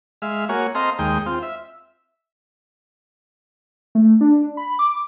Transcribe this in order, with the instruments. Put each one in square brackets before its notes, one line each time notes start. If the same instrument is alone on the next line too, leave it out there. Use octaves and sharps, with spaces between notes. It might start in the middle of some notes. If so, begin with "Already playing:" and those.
[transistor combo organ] G#3 E5 F5
A#3 F#4 C#5 G#5
C4 A4 D#5 F5 A#5 C6
D#2 G#3 G5 D#6
C4 F4
E5
[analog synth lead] A3
D4
B5
D6